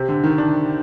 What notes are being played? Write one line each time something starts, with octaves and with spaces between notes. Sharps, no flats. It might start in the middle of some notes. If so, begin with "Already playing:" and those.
Already playing: C3
D3
D#3
D4